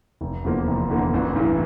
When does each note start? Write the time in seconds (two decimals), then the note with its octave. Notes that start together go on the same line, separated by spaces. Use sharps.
0.21 F1
0.44 E2 D3 F3 A#3
0.67 F1
0.90 E2 D3 F3 A#3
1.14 A1
1.36 G2 E3